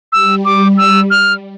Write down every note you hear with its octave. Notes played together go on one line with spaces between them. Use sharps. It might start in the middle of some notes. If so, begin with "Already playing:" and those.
G3 E6
D6
E6
F6